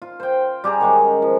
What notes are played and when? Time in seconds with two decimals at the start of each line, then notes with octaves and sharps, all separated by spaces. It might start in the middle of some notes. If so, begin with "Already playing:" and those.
0.02 F4
0.20 C5 G5
0.64 G3 G4 G#4 A#5
0.81 D#3 G#3 C#4
1.22 F3